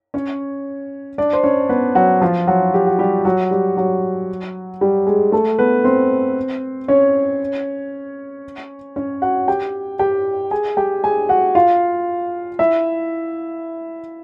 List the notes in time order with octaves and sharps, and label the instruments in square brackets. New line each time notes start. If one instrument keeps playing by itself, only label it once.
[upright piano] C#4 C#5
D4 D5
C5
C#4 C#5
B3 B4
F#3 F#4
F3 F4
F#3 F#4
G4
F#4
G3 G4
F#3 F#4
G3 G4
F#3 F#4
G3 G4
G#3 G#4
A3 A4
B3 B4
C4 C5
C#4 C#5
C#4 C#5
F#4 F#5
G4 G5
G4 G5
G#4 G#5
G4 G5
G#4 G#5
F#4 F#5
F4 F5
E4 E5